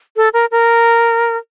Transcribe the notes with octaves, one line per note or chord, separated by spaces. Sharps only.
A4
A#4
A#4